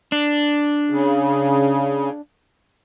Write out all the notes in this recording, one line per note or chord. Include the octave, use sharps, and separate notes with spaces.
D4
C#3